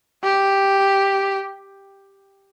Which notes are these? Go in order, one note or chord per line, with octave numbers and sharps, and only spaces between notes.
G4